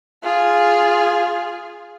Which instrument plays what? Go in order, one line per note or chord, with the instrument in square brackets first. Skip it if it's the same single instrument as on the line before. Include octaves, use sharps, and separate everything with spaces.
[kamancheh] F4 G#4